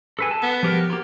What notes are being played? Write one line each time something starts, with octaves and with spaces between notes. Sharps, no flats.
A4 B4 G#5
A4 A5
B3
F3 G4 A#4
A#3 F4 G4